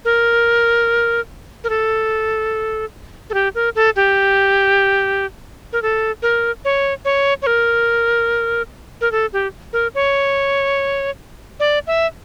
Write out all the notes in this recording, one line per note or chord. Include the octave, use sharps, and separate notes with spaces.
A#4
A#4
A4
A4
G4
A#4
A4
G4
A#4
A4
A#4
C#5
C#5
C#5
A#4
A#4
A4
G4
A#4
C#5
D5
E5